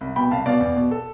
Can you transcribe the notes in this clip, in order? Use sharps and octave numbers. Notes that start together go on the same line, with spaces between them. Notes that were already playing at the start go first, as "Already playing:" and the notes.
C2
B2 G5 B5
C2 F5 A5
B2 D5 F5
E2
B2
A4